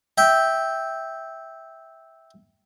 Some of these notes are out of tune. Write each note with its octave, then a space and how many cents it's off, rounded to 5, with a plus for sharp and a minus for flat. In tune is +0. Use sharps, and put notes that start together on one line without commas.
E5 -10 G5 +0